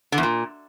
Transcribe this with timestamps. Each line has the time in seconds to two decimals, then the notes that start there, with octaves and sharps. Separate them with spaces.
0.12 D3
0.18 E2
0.23 A#2